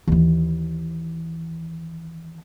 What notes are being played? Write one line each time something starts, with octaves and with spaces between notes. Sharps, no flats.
D#2 E3